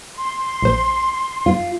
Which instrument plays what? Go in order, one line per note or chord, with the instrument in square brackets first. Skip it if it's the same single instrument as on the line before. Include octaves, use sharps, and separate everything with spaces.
[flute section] C6
[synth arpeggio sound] A#1 C5
[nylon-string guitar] F4